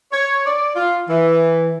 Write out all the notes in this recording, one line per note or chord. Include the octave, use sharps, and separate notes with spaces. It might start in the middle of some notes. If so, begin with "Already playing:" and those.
C#5
D5
F4
E3